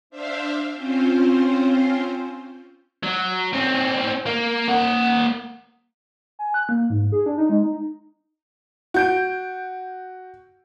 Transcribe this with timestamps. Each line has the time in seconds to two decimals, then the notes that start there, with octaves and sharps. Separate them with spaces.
0.10 D4 C5 E5 F5
0.74 C4 C#4 F4 C5
3.03 F#3
3.53 C4 C#4
4.26 A#3
4.68 A#3 F#5
6.39 G#5
6.54 F#6
6.69 A#3
6.90 G#2
7.12 G#4
7.26 D4
7.38 D#4
7.50 G#3
7.63 D#4
8.94 F#4 G6 D7